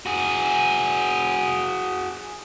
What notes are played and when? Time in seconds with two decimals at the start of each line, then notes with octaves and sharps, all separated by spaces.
0.06 F#4 G#4